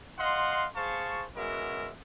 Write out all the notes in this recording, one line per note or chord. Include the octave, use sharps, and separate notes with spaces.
D#5 F5 F#5 C6
G#4 C5 F5 A5 C#6
G#3 B3 C#4 F#4 A#4 E5